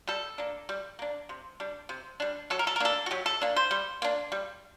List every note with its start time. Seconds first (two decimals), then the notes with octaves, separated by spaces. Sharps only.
0.08 G3 A4
0.38 A#3 D4
0.69 G3
0.99 A#3 D4
1.29 C3
1.60 G3 D4
1.89 C3
2.20 G3 D4
2.50 F#3 A4
2.59 A#4
2.67 A4
2.76 A#4
2.80 A#3 D4 A4
3.06 F#4
3.11 F#3 G4
3.26 A4
3.42 A#3 D4
3.56 C5
3.71 G3
4.02 A#3 D4
4.32 G3